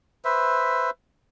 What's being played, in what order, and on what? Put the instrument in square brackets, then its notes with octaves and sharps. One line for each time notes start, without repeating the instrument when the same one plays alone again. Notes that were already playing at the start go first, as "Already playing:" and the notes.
[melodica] B4 C5 E5